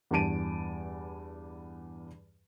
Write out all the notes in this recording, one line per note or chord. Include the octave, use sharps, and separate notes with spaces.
E2 G2 G#5 A5 D7 D#7